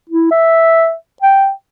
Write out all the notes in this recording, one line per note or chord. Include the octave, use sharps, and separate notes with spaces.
E4
E5
G5